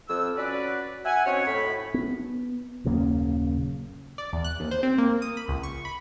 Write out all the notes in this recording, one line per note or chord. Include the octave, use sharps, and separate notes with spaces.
F2 E6
C#4 F#4 B4 D5
E5 F#5 G#5
C4 C#4 D#4 F#4 C#5
A2 B5
B3
D#1 F#2 C#3 A#3
D5
E2
F#6
D#2
C5
C4
A#3
D#6
B5
C#2
C#6
B5